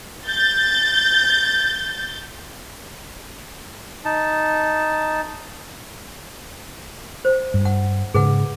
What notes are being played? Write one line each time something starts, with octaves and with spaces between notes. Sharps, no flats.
G6 A6
D#4 A5
C5
G2
F#5
G#2 C#3 G#4 B4 F#5